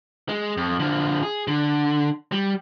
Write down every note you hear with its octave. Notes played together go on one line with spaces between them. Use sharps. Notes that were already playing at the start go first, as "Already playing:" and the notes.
G#3
F2
D3 F3
G#4
D3
G3